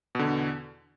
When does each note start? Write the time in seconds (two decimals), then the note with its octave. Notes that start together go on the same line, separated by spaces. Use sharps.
0.15 B2
0.19 D3
0.24 E2